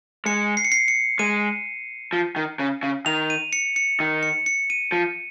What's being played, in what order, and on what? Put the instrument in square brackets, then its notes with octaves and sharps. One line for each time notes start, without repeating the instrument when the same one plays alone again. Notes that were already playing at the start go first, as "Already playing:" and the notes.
[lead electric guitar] G#3 [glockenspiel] C#7
[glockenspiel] C7
C#7
C7
C#7
[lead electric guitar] G#3 [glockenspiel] D#7
[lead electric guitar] F3
D#3
C#3
C#3
[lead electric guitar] D#3 [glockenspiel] F7
[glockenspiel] D#7
C#7
C#7
[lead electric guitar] D#3
[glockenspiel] C#7
C#7
D#7
[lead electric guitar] F3